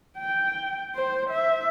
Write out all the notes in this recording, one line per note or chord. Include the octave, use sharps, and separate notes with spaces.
G5
C5
E5